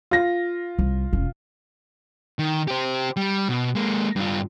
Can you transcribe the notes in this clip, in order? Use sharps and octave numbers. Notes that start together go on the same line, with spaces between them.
F4 A#6
C2
E1 C#4
D#3
G4 C5
G3
B2
G#3 A#3
G2 F4